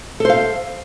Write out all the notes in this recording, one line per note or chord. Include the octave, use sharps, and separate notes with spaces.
A4 C5 F5